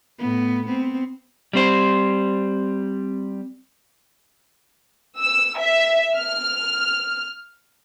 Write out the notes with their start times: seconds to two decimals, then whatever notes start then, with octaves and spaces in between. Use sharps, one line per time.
0.18 A2 B3
0.66 B3 C4
1.53 G3 C4 C5
5.17 E6
5.57 E5
6.15 F6